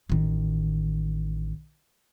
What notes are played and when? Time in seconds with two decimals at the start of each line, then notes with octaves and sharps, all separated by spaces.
0.10 A1 D#3